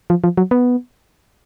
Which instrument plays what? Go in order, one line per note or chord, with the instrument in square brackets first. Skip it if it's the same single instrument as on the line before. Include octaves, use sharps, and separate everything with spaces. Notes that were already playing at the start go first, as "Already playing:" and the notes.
[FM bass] F3
F3
F#3
B3